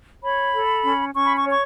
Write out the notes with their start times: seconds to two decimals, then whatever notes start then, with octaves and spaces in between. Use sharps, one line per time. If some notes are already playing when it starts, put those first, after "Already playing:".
0.22 C#5 B5
0.53 A4
0.83 C#4
1.14 C#4 C#6
1.26 B5
1.36 C#6
1.44 C#5
1.50 C#6